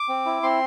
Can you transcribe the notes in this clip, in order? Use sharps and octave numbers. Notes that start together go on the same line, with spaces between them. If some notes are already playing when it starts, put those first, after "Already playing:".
Already playing: D6
C4
E4
C4 C6